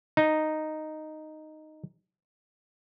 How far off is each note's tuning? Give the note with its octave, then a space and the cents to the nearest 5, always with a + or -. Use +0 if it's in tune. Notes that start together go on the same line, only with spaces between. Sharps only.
D#4 -5